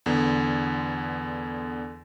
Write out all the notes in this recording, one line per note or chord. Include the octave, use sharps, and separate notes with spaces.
E2 D3 B3